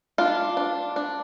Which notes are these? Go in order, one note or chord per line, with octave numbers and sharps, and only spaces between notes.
D4 F4
D4
D4